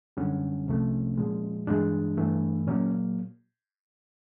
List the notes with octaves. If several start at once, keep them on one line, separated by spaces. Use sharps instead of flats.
F#2 D3 G3 C#4
C2 C3 F3 A3
A#2 F3 G#3
G2 E3 G#3 D4
G2 E3 A3
A#2 F#3 A#3 C#4